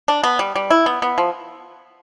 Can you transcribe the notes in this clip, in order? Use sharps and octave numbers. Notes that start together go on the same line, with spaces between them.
D4
B3
G3
G3
E4
B3
B3
F3